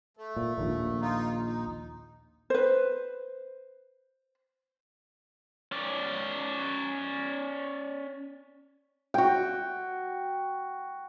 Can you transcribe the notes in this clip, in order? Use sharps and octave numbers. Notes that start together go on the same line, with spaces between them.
A3
A#2
A#1 D#2 A#2
D#4 F4
D#4
B4 C5
C#4 D5
F#4 G5